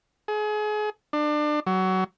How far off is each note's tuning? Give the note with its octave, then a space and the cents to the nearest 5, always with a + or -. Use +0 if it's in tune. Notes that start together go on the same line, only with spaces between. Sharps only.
G#4 +35
D4 +30
F#3 +20